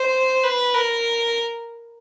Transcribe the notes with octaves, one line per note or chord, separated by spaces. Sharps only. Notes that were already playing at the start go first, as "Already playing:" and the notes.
Already playing: C5
B4
A#4